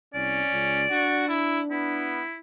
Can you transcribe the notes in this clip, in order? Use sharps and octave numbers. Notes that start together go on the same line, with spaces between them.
C2 C#4 D5
C#2
D4 F#4
E4
B3 E4